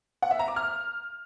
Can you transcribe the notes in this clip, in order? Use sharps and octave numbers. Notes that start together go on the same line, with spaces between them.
F#5
E5
A#5
D6
F6